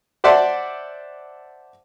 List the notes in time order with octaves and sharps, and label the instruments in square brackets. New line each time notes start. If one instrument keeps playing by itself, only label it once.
[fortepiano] C5 D5 E5 F#5 A5 C6